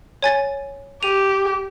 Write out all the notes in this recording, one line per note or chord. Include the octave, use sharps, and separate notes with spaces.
C#5 G#5 A6
G4 D#7 F7